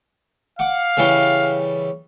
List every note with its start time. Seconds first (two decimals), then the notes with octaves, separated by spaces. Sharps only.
0.59 F5 F#5 D6
0.97 C#3 E3 G3